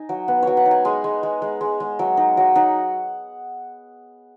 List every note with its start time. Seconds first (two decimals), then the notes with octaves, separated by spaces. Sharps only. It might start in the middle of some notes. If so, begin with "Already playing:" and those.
Already playing: D#4 G#5
0.09 F#3
0.28 B3 F#5
0.43 F#3 C#5
0.57 F#5
0.66 D#4
0.71 G#5
0.85 G#3 G#5
1.04 G#3
1.23 G#3
1.42 G#3
1.61 G#3
1.80 G#3
1.99 F#3
2.17 D#4
2.37 F#3
2.56 D#4 F#5